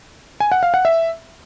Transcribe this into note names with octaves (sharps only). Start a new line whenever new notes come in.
G#5
F#5
F5
F#5
E5